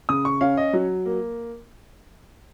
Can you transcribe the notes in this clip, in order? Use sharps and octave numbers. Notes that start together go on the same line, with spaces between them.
C#3 D#6
C#6
C#4 F5
D#5
F#3
A#3